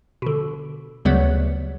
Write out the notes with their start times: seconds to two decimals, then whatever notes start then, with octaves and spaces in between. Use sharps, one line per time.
0.22 B2 D3
1.05 D2 C#3 F#3 G3 B3